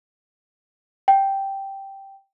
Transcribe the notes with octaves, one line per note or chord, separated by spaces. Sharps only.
G5